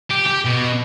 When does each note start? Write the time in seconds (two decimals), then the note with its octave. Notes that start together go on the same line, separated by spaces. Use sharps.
0.11 G4
0.27 G4
0.46 B2